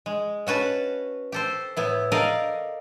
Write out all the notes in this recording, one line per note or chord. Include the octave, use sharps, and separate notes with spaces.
G#3
C#4 F#4 B4 A5
G4 A4 C5
A2 B3 E4
G4 A4 A#4 D5 D#5 F5